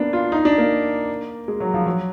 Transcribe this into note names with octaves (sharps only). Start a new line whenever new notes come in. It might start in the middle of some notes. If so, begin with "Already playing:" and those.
Already playing: A#3 B3 D4
F4
D#4
D4
A#3
G#3
F#3
F3
F#3